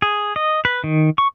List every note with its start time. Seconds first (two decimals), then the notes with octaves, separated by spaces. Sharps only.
0.02 G#4
0.36 D#5
0.65 B4
0.84 D#3
1.18 C#6